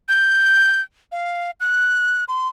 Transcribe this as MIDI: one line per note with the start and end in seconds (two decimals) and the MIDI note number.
0.08 0.81 91
1.12 1.51 77
1.60 2.24 90
2.28 2.48 84